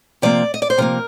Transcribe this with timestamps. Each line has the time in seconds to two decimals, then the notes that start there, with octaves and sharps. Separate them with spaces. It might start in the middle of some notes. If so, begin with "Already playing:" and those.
0.22 C3 F3 A#3 D5
0.54 D#5
0.62 D5
0.70 C5
0.78 C3 F3 A#3 A#4